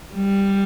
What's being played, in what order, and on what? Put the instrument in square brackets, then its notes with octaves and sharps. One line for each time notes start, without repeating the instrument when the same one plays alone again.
[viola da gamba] G3